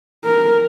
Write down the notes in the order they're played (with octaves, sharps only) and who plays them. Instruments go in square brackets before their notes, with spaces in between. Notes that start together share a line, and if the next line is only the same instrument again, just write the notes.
[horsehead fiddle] A#4